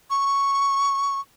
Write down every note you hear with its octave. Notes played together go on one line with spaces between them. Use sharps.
C#6